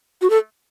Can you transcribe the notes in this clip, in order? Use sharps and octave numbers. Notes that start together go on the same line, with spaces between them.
F#4
A4